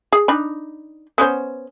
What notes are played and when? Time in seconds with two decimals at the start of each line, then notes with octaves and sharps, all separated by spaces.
0.12 G#4
0.28 D4 D#4 B5
1.18 B3 C#4 C5